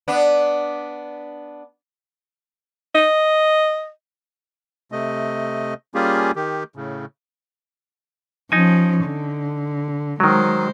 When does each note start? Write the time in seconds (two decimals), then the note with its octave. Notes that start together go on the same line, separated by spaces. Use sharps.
0.08 B3 D4
2.95 D#5
4.92 C3 A3 D#5
5.95 G3 A#3 C#4 F4 G4 G#4
6.36 D#3 G4
6.76 A2 C#3
8.52 F3 C#4 D#4 G#5
9.05 D3
10.20 D#3 F#3 G#3 C5